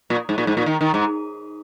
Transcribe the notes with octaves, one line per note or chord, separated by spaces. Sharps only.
A#2
G#2
A#2
G#2
A#2
D#3
D#3
G#2